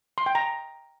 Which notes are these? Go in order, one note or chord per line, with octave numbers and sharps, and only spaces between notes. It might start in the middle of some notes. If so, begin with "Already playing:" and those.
C6
G5
A#5